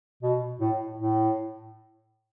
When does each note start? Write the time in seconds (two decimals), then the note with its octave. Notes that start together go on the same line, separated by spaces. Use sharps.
0.23 B2
0.61 A2
0.98 A2